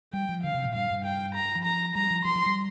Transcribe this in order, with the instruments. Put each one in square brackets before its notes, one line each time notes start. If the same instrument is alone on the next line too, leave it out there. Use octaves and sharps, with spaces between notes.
[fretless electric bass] G3 [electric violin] G5
[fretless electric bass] F3
[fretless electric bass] D3 [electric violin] F5
[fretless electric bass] C3
A#2
[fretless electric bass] G2 [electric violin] F5
[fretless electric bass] G2
[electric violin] G5
A#5
[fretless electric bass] F3
[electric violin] A#5
[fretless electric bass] G3 [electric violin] A#5
[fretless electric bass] F3
[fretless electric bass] F3 [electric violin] C6
[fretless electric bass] F3
G3